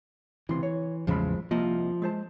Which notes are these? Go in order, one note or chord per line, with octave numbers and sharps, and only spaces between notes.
C#2 C3 E3 C6
C#5
A1 E2 C#3 F3 G#3 B5
C2 F3 A#3 D#5
G#3 C5 A5